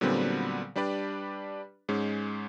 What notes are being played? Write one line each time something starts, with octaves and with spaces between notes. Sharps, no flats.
A#2 D3 F#3 G3 B3 C4
G3 D4 G4 B4 D5
G#2 G#3 C#4